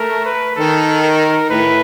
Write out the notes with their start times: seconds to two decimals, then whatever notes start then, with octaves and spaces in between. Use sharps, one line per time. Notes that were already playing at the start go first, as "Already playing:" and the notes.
Already playing: A3 A#4
0.26 B4
0.56 D#3 A4
1.03 A#4
1.50 A2 B4